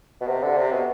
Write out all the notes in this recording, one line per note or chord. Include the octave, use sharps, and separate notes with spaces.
B2
C3
D3
C3
B2